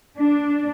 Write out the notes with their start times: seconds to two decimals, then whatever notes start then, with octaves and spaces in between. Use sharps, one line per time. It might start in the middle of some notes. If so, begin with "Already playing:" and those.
0.18 D4